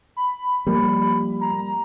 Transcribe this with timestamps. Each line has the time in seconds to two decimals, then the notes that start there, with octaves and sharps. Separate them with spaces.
0.17 B5
0.67 F3 G3 A#3
1.41 A#5